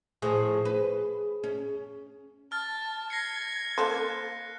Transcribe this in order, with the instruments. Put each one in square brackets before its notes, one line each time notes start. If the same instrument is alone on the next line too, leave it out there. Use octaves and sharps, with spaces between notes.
[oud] A2 F3 [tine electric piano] G#4
[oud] B4
C#4
[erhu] A5 [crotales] F6 A6
[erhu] G#6 [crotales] A#6 C7 C#7
[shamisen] A#3 A4 C5 [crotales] F#6